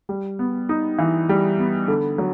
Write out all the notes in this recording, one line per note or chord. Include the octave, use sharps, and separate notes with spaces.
G3
B3
D#4
E3
G3
B3
D3
F#3